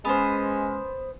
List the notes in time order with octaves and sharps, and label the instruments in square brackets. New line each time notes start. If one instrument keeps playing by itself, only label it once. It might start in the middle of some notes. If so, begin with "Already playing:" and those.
[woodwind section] G#3 C#4 [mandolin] B3 C5